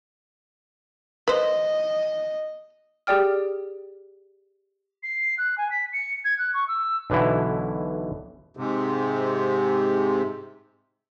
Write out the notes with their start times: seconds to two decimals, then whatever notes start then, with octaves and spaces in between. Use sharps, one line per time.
1.28 B4 C5 D#5
3.07 G4 G#4 D5 G5 F6
5.03 C7
5.38 F#6
5.58 G#5
5.71 B6
5.93 C#7
6.24 G#6
6.39 F#6
6.54 C#6
6.68 E6
7.10 B1 B2 D3 E3 E4
8.57 G#2 C3